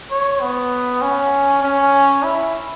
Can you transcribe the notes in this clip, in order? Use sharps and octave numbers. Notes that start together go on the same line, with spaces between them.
C#5
B3
C#4
C#4
E4